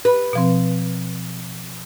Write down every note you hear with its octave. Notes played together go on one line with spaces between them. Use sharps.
B4
B2 F3 C4